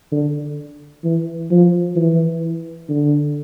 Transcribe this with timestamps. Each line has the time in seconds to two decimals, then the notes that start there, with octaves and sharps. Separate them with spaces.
0.11 D3
1.04 E3
1.51 F3
1.96 E3
2.89 D3